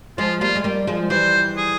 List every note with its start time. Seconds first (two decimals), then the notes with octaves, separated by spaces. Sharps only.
0.18 F3 G#3 F4
0.41 G3 A#3 F4
0.56 G#3
0.64 G3 A#3
0.87 F3 G#3
1.10 E3 G3 C5
1.57 G#4